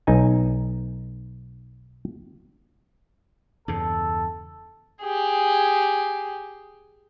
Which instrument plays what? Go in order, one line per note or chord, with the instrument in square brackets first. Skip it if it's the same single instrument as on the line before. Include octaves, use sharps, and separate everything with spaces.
[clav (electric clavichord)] B1 D#4 G#5
[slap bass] E2 G2 C#3 [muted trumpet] A4
[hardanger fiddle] G4 G#4